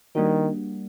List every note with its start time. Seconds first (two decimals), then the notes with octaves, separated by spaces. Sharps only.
0.15 D#3 G3 A#3 D4 F#4